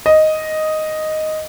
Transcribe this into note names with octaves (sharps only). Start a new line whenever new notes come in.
D#5